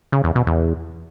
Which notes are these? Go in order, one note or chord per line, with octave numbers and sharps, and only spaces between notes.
C#3
E2
B2
E2